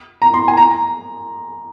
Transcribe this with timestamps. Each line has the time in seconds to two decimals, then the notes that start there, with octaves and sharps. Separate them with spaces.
0.22 A#5
0.34 C6
0.48 G#5
0.57 A#5